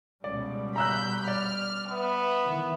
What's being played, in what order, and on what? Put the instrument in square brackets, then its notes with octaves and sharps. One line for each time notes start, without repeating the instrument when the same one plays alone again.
[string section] C#2 [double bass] B2 G3 [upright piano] D5
[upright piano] A#5 E6 F#6 [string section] B5 G6
[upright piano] D5 [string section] F6
[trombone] B3 [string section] B4 E5
[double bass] D#3 E3